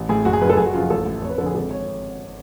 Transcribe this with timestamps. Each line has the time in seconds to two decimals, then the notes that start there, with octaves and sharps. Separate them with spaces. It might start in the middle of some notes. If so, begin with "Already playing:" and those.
Already playing: A1
0.09 A2 G#4
0.25 F#1 F#4
0.33 G#4
0.41 F#2 C#3 B4
0.50 A4
0.57 F#1 G#4
0.66 F#4
0.74 F2 C#3 F4
0.82 G#4
0.90 A1 A4
1.06 A2
1.22 F1 C#5
1.30 B4
1.38 F2 D3 A4
1.46 G#4
1.55 G#1 A4
1.71 C#5